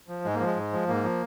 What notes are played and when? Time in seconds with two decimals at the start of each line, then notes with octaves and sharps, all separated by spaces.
0.08 F3
0.25 G#2 G#3
0.35 A#3
0.40 F3
0.45 G#3
0.56 G#2
0.73 F3
0.88 G#2 A#3
1.04 F3